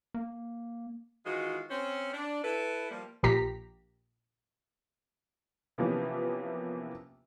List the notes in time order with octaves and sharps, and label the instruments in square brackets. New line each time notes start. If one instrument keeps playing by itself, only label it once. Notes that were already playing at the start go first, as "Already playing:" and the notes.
[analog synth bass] A#3
[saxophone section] D#3 E3 G#3 D#4 F4 F#4
C4 C#4 C5
D4
E4 A4 B4
F3 G3 A#3
[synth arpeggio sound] A#1 A#2 G4 A#5 B6
[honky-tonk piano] C3 E3 F3 A#3 B3 C#4